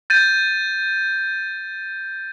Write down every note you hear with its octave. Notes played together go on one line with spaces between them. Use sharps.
G6 A6 D#7